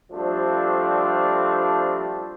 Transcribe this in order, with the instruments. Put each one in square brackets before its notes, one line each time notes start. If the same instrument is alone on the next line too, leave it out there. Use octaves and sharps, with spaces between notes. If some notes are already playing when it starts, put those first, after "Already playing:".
[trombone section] F3 G3 A3 C4 D4 A4